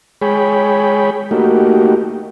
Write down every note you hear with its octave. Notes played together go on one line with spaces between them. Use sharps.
G#3 G#4 C#5 G5 B5
A3 A#3 D#4 F#4 G4